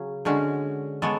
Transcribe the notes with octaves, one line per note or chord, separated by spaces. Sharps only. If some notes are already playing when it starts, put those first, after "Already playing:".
Already playing: C#3 F#3 C#4 G#4
D3 G#3 C#4 F#4
G#3 B3 A4 C#5